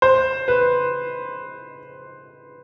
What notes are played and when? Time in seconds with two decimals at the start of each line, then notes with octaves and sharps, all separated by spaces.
0.02 C5
0.48 B4